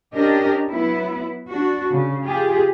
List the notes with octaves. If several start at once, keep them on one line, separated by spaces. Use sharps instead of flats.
C#4 D4 G4 A#4 D#5
F#3 B3 E4
D4 F#4
C#3
F4 G4 G#4